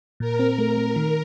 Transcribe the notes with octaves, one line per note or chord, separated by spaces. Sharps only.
A#2 A#4
C4
A3
A3
D#3